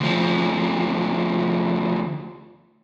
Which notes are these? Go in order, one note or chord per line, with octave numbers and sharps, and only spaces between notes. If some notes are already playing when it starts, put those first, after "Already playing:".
D2 F3